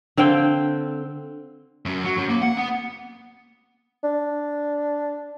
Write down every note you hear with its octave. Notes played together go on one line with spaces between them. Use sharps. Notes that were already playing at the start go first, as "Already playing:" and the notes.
D3 C4 F5 G5
F#2
F#3
F#2
A#3
F#5
B3
D4